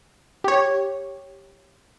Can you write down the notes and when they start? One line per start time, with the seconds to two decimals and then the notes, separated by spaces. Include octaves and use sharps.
0.44 G4 C#5